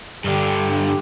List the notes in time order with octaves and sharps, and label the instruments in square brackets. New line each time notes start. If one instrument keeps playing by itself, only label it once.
[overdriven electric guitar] G2 D3 [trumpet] G4